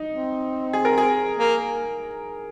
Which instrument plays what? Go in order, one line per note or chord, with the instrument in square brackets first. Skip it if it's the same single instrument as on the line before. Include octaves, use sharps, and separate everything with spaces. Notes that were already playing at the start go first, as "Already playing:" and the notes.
Already playing: [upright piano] D#4
[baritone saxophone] C4
[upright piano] G#4
A#4
G#4
[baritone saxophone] A#3